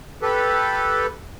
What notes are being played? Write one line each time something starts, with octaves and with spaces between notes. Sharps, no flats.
G4 A4 B4